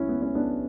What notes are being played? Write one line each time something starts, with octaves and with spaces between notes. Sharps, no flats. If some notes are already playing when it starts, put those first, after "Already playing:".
Already playing: C#2 F#3 C#4 E4
B3
C#4
B3 D4